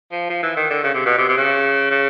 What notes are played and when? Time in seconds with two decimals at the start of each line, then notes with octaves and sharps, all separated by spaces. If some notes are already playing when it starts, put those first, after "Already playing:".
0.12 F3
0.30 F3
0.43 E3
0.57 D#3
0.70 D3
0.84 C#3
0.94 C3
1.06 B2
1.18 C3
1.29 C3
1.37 C#3
1.90 C#3